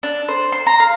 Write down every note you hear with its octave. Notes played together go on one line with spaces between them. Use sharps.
D4
C5
C6
A#5
F5